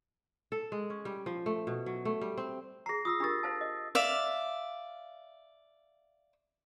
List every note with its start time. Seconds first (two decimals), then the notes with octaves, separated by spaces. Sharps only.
0.52 A4
0.72 G#3
0.90 C#4
1.05 G3
1.26 F3
1.46 A3
1.67 B2
1.86 F#3
2.05 A3
2.21 G3
2.38 C4
2.86 G#4 A#5 A#6 C7
3.05 F4 D#6 E6 A#6
3.20 D4 G4 A#4 A6 A#6
3.43 C5 F5 A5
3.61 D#5
3.95 D5 E5 F5